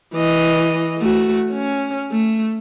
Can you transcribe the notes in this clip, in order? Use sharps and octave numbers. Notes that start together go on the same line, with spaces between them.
E3 D#5
A3 F#4
C#4
A3